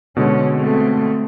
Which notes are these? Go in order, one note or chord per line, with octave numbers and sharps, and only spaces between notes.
B2 D3 G#3 C#4
A3 C4